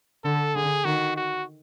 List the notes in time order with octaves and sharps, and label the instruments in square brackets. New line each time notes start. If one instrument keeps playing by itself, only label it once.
[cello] D3 [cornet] A4
[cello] D3 [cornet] G#4
[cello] D#3 [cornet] F#4
[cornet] F#4